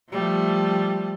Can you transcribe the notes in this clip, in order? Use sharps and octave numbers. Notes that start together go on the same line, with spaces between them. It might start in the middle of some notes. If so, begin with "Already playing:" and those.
F3 G3 A3